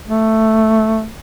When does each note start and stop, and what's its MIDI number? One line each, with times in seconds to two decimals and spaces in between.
0.08 1.08 57